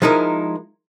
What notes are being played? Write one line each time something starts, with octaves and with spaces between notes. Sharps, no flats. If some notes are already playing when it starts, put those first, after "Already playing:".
F3 G#3 D#4 E4 A#4